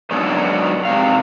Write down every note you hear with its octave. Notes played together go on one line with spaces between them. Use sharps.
G#2 B2 D#3 F#3 D4 G#4
G#2 C3 F5